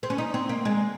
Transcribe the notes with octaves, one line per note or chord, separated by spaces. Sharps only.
C4
C#4
D#4
C4
A#3
G#3